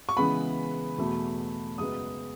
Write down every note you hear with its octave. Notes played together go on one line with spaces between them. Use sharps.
C#6
C#3 E3 G#3 B3 B5
E2 B2 A3
F#2 C#3 G#3 B3 D#6